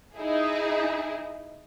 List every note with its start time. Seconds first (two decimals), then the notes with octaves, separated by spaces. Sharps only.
0.17 D#4 E4 G#4